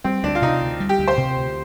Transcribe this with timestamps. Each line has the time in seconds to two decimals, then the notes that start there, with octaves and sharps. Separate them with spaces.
0.04 G3 C4
0.23 D2 D4
0.35 F4
0.42 C3 D#4
0.62 D2
0.80 G3
0.89 G4
0.99 D2
1.08 C5
1.17 C3
1.36 D2